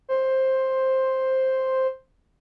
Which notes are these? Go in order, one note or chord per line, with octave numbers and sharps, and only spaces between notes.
C5